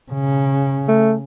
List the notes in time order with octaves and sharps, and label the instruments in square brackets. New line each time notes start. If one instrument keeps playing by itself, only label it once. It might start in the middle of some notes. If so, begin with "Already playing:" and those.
[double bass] C#3
[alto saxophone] A3